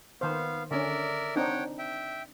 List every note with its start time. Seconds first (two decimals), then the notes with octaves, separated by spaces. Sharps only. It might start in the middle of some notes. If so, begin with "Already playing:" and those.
0.21 D#3 B3 C5 F5
0.71 D3 C#4 A#4 D5 E5
1.36 C4 D4 D#4 C#5 F#5 G5
1.79 E5 G5